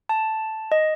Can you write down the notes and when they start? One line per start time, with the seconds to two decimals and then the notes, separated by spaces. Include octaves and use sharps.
0.09 A5
0.72 D#5